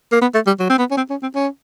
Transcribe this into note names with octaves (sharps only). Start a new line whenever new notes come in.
A#3
B3
A3
G3
F#3
C4
B3
C#4
C4
C#4
C4
C#4